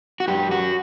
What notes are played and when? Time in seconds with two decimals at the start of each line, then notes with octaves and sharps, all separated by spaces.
0.20 F#4
0.28 F#2 G4
0.51 F#4